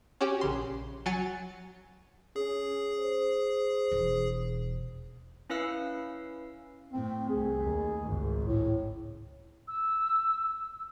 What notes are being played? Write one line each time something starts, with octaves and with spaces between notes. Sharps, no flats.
C#4 F#4 G4
A#1 C#3 C6
F#3 G#5 A6 C#7
C#4 G#4
C5
E1
C#4 E4 B4 F5 E6 C7
A2 C4
C2 A3 G#4
D#2
G#1 C#2
A2
E6